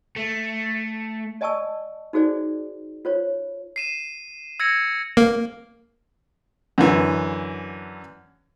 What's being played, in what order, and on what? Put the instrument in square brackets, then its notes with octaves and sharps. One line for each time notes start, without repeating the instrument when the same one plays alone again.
[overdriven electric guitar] A3
[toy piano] D5 D#5 G#5 A5 C#6 E6
D#4 F#4 G#4 C5 D5
F4 C5 C#5
[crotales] C7 D#7 E7
E6 G#6 A#6 C#7
[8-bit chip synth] A#3
[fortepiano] F#2 D3 E3